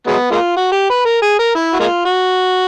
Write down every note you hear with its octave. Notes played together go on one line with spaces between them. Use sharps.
F#3 G#3 B3
G#3 A#3 F4
F#4
G4
B4
A#4
G#4
A#4
E4
F#4
G#3 A#3 F4
F#4